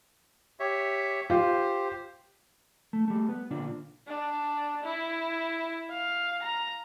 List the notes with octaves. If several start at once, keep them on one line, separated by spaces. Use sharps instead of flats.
G4 C#5 E5
F4 G4 C5
A3
G3 A3
B3
A#2 D3 D4 F4
D4
E4
F5
A#5